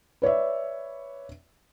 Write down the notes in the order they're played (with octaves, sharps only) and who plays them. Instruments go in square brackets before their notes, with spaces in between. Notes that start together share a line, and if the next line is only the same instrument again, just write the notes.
[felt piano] B4 C#5 D5 E5